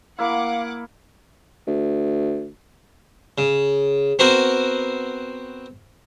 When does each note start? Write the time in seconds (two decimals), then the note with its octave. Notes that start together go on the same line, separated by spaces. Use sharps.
0.19 A#3 E4 F5 F#5 D6
1.67 D2
3.38 C#3
4.19 B3 C4 F#4 A#4 C5